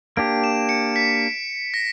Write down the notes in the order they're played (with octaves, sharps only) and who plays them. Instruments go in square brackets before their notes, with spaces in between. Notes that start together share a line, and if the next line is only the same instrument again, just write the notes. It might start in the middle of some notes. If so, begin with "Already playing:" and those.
[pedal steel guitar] A#3 D4 G4 [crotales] D7
[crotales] E7
C#7
B6
A#6